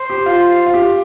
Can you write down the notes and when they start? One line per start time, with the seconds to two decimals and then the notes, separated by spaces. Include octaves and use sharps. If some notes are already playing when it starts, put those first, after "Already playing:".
Already playing: C5
0.10 G4
0.26 F4
0.66 F4
0.74 G4